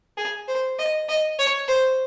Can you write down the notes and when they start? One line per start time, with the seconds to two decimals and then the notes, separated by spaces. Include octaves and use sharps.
0.17 G#4
0.48 C5
0.79 D#5
1.09 D#5
1.39 C#5
1.68 C5